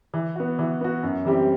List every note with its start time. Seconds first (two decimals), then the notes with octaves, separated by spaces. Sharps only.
0.14 E3
0.36 B3 F#4
0.59 E3
0.81 B3 F#4
1.03 F#2
1.25 E3 G3 C4 G4